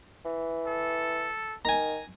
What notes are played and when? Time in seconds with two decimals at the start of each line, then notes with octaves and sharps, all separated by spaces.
0.25 E3
0.66 A4
1.65 D#3 G#5 A#5